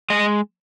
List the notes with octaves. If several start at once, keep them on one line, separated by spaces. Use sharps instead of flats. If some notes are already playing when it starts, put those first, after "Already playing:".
G#3 D#5